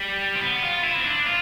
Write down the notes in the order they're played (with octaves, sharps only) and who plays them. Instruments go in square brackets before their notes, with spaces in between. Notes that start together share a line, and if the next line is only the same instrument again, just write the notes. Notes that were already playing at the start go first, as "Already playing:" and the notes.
Already playing: [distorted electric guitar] G3
C4
B3
F4
E4
C4
D4
F4